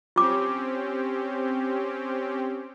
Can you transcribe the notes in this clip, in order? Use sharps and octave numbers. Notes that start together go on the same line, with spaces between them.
C4 C#4 F4 G4 D6